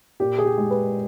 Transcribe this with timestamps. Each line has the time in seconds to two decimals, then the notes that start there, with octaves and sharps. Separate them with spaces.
0.20 A#2 G4
0.38 G#4
0.45 G4
0.58 G#3
0.71 B4